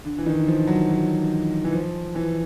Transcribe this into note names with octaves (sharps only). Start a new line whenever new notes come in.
D3
E3
D#3
F3
F#3
F#3
E3
F3
E3